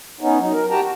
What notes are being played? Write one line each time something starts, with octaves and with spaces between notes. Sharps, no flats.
B3 C#4 D#4
F#3 D#4
A#4
F#4 G4 G5 A5 A#5
F#4